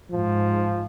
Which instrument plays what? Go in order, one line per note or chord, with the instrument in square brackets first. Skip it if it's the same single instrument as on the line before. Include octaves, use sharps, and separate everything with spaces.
[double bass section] G#2 [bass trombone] F3